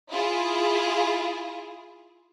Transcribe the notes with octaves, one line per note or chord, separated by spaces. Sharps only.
E4 F4 G#4